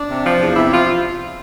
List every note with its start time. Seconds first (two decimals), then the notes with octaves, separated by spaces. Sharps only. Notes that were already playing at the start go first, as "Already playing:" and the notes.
Already playing: D4
0.09 C3
0.23 F3
0.40 E2
0.56 C3 E4
0.72 F3 F4